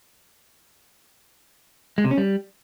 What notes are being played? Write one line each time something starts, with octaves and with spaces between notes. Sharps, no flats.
G#3
C3
C#4
G3